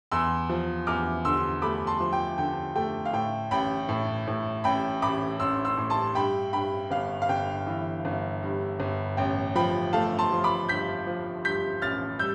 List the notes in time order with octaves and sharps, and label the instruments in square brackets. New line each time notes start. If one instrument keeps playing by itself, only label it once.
[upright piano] E2 C6 E6
F3
E2 D6 F6
D3 C6 E6
A3 B5 D6
A5 C6
F3
G5
D3 G5
A3 G5
F5
A2 G5
A1 G5 B5
A2
A2
A1 G5 B5
A1 B5 D6
A1 C6 E6
C6 E6
A2
A5 C6
G2 G5 B5
G2 G5 B5
G1 F5
F5
G1 G5
E3
G1
G2
G1
A1 G5
F3 G5 B5
A3 F5 A5
A5 C6
F3
B5 D6
G2 G6 B6
F3
G2 G6 B6
A1 F6 A6
G3 E6 G6